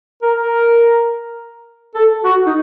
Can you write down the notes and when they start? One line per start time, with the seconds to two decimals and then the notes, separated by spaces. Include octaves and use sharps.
0.22 A#4
0.40 A#4
1.95 A4
2.24 F#4
2.46 D#4